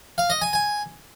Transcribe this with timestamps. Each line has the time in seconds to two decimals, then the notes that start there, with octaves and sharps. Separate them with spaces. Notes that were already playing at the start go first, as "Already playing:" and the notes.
0.18 F5
0.30 D#5
0.42 G#5
0.53 G#5